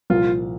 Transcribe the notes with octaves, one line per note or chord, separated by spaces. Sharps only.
C2 A#2 F3 F4